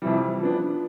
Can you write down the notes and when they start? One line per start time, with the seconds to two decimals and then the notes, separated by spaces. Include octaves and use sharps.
0.02 F2 C3 E3 G3
0.41 F3 B3 D4